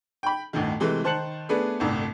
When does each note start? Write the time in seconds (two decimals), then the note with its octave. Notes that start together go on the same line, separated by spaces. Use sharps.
0.23 G5 B5
0.53 G1 D2 A2 D#3
0.80 C3 E3 G#3 A3
1.04 D#3 C5 A5 F#6 C#7 F#7
1.49 A3 B3 D4 G#4 B4
1.80 G1 C2 A2